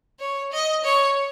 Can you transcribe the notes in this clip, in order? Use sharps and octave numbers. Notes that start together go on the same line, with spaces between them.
C#5
D#5
C#5